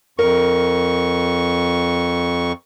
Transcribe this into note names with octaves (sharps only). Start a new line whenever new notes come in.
F2 A#4 C#6